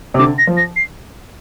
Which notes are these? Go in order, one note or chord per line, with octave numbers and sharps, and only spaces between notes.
C3
D3 D6
A#6
F3
A#6
C7